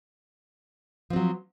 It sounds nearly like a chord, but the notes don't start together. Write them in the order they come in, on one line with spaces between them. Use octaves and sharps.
F3 C4 F#3